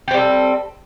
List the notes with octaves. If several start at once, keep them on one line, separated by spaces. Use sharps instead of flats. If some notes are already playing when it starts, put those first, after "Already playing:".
G3 C4 G4 A4